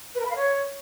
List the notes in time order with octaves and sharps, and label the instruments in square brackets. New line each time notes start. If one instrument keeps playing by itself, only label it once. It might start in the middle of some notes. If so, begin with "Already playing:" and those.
[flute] B4
A#4
B5
F5
C#5